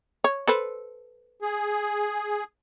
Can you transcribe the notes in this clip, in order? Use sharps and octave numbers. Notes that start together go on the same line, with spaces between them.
C#5
A4 B4 C5
G#4